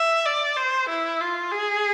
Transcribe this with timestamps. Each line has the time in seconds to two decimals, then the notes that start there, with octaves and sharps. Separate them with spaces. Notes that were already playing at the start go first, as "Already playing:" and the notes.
Already playing: E5
0.26 D5
0.57 C5
0.89 E4
1.21 F4
1.51 G#4